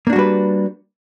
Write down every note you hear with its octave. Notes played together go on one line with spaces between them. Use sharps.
G3 A#3 D4 F#4 B4